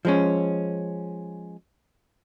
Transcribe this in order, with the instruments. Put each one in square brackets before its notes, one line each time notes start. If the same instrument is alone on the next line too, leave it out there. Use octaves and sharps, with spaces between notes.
[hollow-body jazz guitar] F3 G#3 C#4